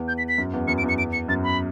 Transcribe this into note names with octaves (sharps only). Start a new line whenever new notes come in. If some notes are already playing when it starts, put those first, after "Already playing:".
Already playing: E2
G6
B6
B6
F#2
E2
F#2 C#7
D7
E2
C#7
D7
C#7
F#2 A6
B5